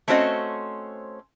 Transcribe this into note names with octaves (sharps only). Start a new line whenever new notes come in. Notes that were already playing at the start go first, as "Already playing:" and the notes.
A3 C4 C#4 F#4 C5 D#5